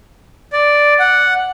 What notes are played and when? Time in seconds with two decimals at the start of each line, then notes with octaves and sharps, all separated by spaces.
0.53 D5
0.99 F#5